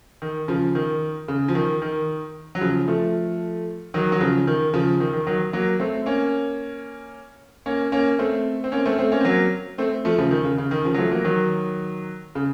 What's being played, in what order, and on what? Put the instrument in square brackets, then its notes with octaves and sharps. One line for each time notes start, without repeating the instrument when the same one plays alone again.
[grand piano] D#3
C#3 F3
D#3
C#3
F3
D#3
D#3
F#3
C#3 F3
F3 A3
D#3 F#3
F#3
C#3 F3
D#3
C#3 F3
D#3
D#3
D#3 F#3
F#3 A#3
A3 C4
A#3 C#4
A#3 C#4
A#3 C#4
A3 C4
C4
A#3 C#4
A3 C4
A3 C4
A#3 C#4
C4
F#3 A#3
A3 C4
F3 A3
C#3 F3
D#3
C#3
C#3
D#3
C#3 F3
F#3
F3 A3
F#3 A#3
D#3 F#3
C#3